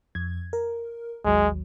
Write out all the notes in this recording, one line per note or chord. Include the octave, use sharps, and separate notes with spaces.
F2 G#6
A#4
A1 D#2 F#3 G#3